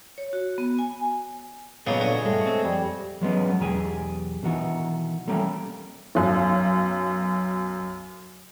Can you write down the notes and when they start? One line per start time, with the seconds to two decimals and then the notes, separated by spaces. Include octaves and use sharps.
0.18 C#5
0.33 F#4
0.58 B3
0.79 G#5
1.87 A#2 C#3 F#3 B3 G#4 C#5 D#5
2.01 D3 F#4
2.25 G2 G#3 A3
2.46 C4
2.64 F2 G3
3.22 F#3 G#3 B3 C#4
3.60 B1 E2 G4 G#4 G#5
4.43 B2 D#3 E3 F#4
5.28 G3 A3 A#3 C#4 G4
6.15 B1 F#2